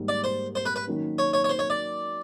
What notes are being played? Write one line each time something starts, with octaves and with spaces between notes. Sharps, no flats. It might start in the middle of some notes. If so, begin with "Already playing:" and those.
Already playing: G#2 D#3 G3 A#3
D5
C5
C5
B4
B4
D#3 F#3 A#3 C#4
C#5
C#5
C#5
C5
C#5
D5